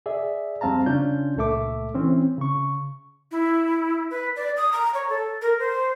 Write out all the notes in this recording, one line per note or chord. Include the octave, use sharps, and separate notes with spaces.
G#4 D5 E5
F2 G3 C4 F5 A5 A#5
C#3 C#4 D4 F4 G6
C#2 A#2 A3 A4 E5 D6
E3 C4 C#4
C#3 C#6
E4
B4
D5
D#6
A#5
C#5
A4
A#4
C5